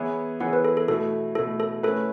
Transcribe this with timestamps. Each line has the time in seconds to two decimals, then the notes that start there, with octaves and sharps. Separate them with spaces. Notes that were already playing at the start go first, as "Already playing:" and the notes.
Already playing: E3 B3 E4 G#4 C#5
0.40 E3 B3 E4 G#4 C#5 F#5
0.53 B4
0.65 A4
0.77 A4
0.88 B2 A3 E4 A4
1.35 B2 A3 E4 A4
1.60 A4
1.83 A3 C#4 E4 A4 B4